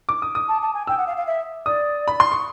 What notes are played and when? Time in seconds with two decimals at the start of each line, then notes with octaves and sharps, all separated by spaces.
0.09 D6
0.22 D#6
0.35 D#6
0.48 A5
0.61 A5
0.74 G#5
0.87 G5 E6
0.97 F#5
1.06 F5
1.17 F5
1.26 E5
1.66 D5 D#6
2.08 B5
2.20 C6
2.32 C#6